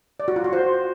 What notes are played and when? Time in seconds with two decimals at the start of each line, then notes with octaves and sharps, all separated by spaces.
0.20 D5
0.28 F#4
0.36 F4
0.44 F#4
0.53 C5